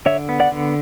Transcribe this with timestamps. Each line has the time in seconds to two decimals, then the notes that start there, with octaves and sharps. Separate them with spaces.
0.06 D3 C#5 E5
0.29 B3
0.40 D5 F#5
0.51 D3